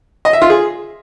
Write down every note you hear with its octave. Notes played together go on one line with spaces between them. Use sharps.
D#5
E5
F4
G#4